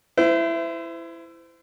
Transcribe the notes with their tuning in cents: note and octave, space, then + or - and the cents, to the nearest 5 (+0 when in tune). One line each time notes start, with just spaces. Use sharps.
E4 +15 C5 -35